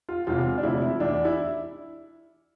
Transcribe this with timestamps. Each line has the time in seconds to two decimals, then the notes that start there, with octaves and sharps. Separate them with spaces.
0.09 F4
0.27 E1 E2 C3 E3 F4
0.58 D4
0.63 E1 D2 C3 F3 E4
0.82 E4
0.99 E2 E3 D4
1.25 E4